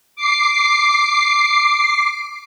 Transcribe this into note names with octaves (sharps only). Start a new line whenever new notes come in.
D6 C7